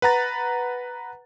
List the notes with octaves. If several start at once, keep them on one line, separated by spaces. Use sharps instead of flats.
B4 F#5 A#5 A6